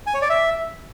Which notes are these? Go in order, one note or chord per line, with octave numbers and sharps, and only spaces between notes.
G#5
C#5
D5
E5